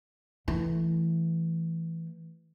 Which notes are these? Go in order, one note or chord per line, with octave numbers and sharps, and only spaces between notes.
E3 A3